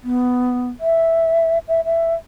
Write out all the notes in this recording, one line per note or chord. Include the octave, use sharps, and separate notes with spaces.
B3
E5
E5
E5